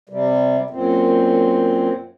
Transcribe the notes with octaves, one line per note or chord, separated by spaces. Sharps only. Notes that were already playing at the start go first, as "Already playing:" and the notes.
C3 G3
F#2 A#2 C4